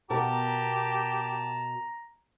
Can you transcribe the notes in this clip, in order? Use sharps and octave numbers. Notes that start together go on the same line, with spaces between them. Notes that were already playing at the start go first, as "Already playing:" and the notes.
B2 G4 A#4 A5 A#5